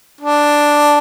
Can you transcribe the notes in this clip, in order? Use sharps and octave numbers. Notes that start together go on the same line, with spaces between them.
D4